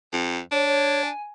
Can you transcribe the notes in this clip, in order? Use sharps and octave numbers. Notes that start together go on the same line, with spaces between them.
F2
D4 C#5
C#5
G#5